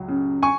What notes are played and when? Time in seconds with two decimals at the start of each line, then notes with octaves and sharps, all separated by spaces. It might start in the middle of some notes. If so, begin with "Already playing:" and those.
Already playing: C#2 F#3
0.08 C#3
0.43 G#5 C#6